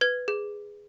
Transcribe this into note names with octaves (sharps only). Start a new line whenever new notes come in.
B4 G#6
G#4